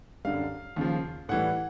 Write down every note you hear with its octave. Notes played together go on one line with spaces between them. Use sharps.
F#2 D3 G3 F5
D#2 C#3 F3
A2 E3 G3 F#5